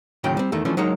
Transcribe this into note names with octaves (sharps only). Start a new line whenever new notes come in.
D#2 A2 C#3 F#3 G5
G3 C4
E2 D#3 A3
E3 F3 A3 C#4 D4
F#3 G#3 A#3 D#4 C#5